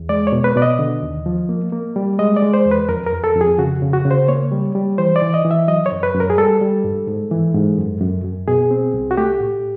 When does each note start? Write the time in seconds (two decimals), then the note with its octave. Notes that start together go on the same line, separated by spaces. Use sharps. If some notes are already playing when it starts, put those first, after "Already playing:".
Already playing: E2
0.09 G#3 D5
0.27 C#5
0.32 B2
0.44 B4
0.56 B2 D5
0.62 D#5
0.79 D3
1.03 D#2
1.26 F3
1.49 A#3
1.72 A#3
1.96 G3
2.19 G#3 D#5
2.36 D5
2.42 G#3
2.54 C5
2.66 E2
2.71 B4
2.89 F2 A#4
3.06 A#4
3.13 F2
3.24 A4
3.35 F2
3.41 G#4
3.58 C#3 F#4
3.82 C#3
3.93 F#4
4.05 C#3
4.11 C5
4.28 A#3 C#5
4.52 G3
4.75 G3
4.98 E3 C5
5.16 D5
5.22 E3
5.34 D#5
5.45 E3
5.51 E5
5.68 F#3 D#5
5.86 C#5
5.92 F#2
6.03 B4
6.15 F#2
6.20 A#4
6.30 G#4
6.38 G3 A4
6.61 G3
6.84 G2
7.07 G#2
7.31 E3
7.55 G#2
7.77 F#2
8.01 F#2
8.24 F#2
8.48 B2 G#4
8.71 C4
8.94 C2
9.11 F#4
9.17 A3 G4
9.40 A2